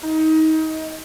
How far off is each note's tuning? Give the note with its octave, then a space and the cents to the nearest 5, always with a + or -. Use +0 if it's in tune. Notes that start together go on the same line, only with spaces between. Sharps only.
D#4 +25